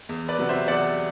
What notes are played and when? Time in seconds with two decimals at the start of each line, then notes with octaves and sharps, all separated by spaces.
0.09 E2
0.28 B4 D5
0.39 C3 F#3
0.49 C5 E5
0.68 E2 D5 F#5